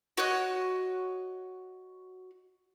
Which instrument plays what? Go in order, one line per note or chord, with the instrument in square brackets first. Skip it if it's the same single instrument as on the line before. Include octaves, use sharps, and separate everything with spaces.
[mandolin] F#4 C#5 D#5 F#6